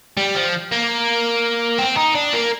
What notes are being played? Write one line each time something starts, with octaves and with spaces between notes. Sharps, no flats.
G3
F3
A#3
C4
D#4
D4
A#3